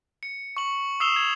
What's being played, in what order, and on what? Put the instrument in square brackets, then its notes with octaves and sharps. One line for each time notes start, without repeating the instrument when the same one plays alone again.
[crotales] C#7
C#6 F#7
D#6 E6 C7 E7 F7 G7
G#6